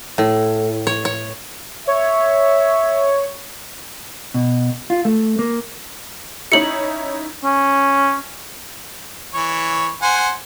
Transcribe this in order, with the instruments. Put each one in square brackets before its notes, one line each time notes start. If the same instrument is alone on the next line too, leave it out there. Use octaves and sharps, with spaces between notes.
[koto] A2
C#5
C#5
[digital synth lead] C#5 [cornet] E5
[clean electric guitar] B2
F4
A3
A#3
[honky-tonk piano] C#4 D#4 E4 [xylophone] C#7 F#7
[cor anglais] C#4
[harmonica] E3 C#5
C5 F#5 G#5